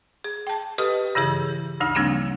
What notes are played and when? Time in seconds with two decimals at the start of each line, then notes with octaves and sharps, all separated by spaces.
0.24 G#4
0.47 G5 A5
0.78 G4 A4 B4 D#5 D#6 F6
1.15 G2 C#3 E3 E4 G#4
1.81 D2 G2 D#4 E6
1.95 C#3 F3 G3 A#3 C4 D4